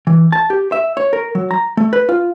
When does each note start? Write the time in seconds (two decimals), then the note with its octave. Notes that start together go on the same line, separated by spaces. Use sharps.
0.07 E3
0.32 A5
0.50 G4
0.72 E5
0.97 C#5
1.13 A#4
1.35 F#3
1.51 A#5
1.77 A3
1.93 B4
2.09 F4